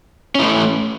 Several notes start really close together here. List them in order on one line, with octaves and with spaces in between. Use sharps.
C#4 E4 A3